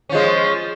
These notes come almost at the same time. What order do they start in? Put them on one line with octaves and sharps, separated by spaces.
C#4 F3 G#3